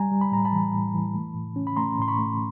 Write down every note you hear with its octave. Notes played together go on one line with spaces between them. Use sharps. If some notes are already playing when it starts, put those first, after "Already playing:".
Already playing: G3 G#5 A#5
G3
B5
A2 A#5
A5 B5
E3
A2
E3
A3
A2
C#4
B5
A3 A#5 C6
A2 C6
B5 C#6
A3